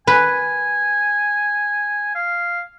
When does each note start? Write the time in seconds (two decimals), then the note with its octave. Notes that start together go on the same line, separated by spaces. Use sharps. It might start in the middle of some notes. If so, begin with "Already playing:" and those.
0.07 B4 G#5
2.15 F5